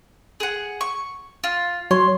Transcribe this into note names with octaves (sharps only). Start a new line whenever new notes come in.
G#4 F#5
C#6
F4
F#3 C#5 C6